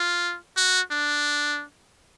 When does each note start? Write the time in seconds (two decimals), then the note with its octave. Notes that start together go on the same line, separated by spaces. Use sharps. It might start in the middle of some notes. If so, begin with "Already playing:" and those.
Already playing: F4
0.57 F#4
0.91 D4